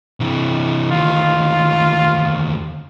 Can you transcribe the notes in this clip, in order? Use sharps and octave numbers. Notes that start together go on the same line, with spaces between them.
C3 E3
D2 D#3 F4